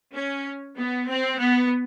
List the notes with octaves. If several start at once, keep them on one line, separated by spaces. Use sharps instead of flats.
C#4
B3
C4
B3